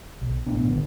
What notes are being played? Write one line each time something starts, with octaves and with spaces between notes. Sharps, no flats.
B1
A#1 A2 B3 D4
G1 D3 F#3